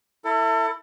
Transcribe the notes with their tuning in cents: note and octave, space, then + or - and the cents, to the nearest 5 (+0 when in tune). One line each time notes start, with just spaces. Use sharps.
E4 +0 A4 +35